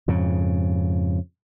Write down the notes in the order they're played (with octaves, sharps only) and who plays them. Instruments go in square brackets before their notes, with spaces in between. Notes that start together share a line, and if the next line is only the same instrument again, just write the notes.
[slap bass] F2 G#2 C#3